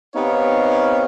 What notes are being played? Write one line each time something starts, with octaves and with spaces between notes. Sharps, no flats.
B3 C4 D#4 G4 C#5 F5